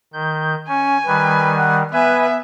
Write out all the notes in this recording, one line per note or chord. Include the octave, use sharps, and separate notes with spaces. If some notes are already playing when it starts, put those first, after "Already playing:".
D#3 G6
C#4 G#5
D#3 G3 B4
F#5
B3 B4 E5 G#5